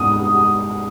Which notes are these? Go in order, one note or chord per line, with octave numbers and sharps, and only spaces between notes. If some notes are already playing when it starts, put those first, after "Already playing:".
Already playing: G#2 B3 D#6